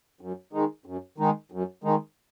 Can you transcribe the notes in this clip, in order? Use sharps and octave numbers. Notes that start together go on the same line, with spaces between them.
F#2
D#3 G#3 D#4
F#2
D#3 G#3 D#4
F#2
D#3 G#3 D#4